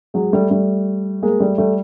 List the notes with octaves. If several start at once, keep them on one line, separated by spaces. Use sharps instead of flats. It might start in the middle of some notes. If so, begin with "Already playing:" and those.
F#3 G#3
G3 A3
G3 A3
G#3 A#3
G3 A3
G3 A3